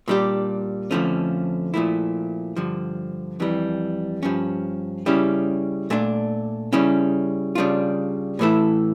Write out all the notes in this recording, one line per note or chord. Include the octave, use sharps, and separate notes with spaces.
A#2 G3 D4 G4
F2 D3 F3 A3 C#4
A#2 F3 A3 E4
G2 D3 F3
F2 E3 G3
G2 F3 C#4
C#3 G3 C#4 E4 G4
A#2 A3 D4
C#3 G3 C#4 E4
C#3 G3 D4 F4
A2 E3 A3 E4 A4